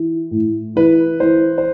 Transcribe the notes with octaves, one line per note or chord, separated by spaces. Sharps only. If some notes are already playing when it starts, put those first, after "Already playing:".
Already playing: E3
A2
E3 B4
E3 C5
C5